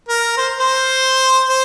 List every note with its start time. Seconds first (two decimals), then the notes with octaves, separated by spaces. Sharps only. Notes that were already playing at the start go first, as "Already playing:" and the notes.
0.09 A#4
0.38 C5
0.59 C5
1.49 C5